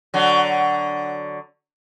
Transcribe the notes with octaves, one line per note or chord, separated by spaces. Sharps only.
D3 F#3